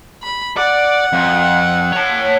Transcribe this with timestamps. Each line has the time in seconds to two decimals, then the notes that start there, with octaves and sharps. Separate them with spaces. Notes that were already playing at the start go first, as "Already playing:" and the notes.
0.23 B5
0.57 D5 F#5
1.13 F2
1.92 C#5 A5